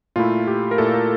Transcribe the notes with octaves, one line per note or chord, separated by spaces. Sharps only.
A#2 A3 E4 F4
G4
A#4
A#2 A3 E4 A4
A#4